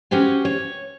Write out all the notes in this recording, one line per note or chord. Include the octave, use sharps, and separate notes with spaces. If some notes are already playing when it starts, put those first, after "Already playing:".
C#4 F#4 G4 C5 G#5
C#5